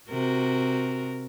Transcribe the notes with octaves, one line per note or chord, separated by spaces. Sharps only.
C3 F#4 A#4